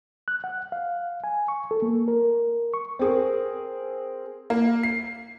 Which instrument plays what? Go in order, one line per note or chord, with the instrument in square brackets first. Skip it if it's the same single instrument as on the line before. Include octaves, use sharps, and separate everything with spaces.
[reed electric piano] F#6
F#5
F5
G#5
C#6
A4
A#3
A#4
C#6
[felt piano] C4 G#4 A#4
[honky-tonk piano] A#3
C7